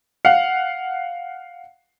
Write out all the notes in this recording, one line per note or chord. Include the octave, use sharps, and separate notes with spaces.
F5 F#5